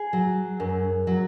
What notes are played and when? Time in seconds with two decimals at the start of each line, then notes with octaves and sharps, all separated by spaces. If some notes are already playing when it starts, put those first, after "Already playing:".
Already playing: G#4
0.13 F#3
0.60 F#2
1.07 F#3